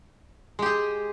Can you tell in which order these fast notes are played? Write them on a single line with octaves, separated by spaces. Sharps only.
G#3 G4 G#4